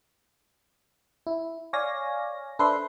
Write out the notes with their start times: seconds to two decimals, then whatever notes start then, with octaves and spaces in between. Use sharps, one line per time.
1.27 E4
1.73 C#5 D5 F5 G#5 A#6
2.59 D4 A4 B4 C5 E5 C6